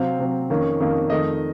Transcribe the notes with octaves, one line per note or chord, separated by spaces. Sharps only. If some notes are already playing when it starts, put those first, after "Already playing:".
Already playing: C3 F#3 C4 F5
C3 F#3 C4
F2 D#3 A#3 C#4
F2 D#3 A#3 C#4
F2 D#3 A3 D#5